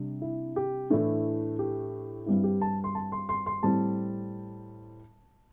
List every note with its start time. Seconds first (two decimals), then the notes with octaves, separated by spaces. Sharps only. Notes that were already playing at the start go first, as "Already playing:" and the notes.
Already playing: C3 G3 D4
0.22 E4
0.56 G4
0.90 A2 E3 A3 D4 E4
1.59 G4
2.26 G2 G3 C4 E4
2.44 G4
2.61 A5
2.84 C6
2.95 A5
3.12 C6
3.29 C6
3.46 C6
3.63 A2 G3 C4 A5